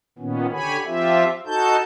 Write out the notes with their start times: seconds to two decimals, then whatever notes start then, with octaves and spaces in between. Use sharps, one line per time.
0.18 A#2 D#3 B3 C#4
0.53 D3 G4 C#5 G#5 B5
0.86 F3 C4 F4 G4 E5
1.46 D#4 F#4 A4 A5 G6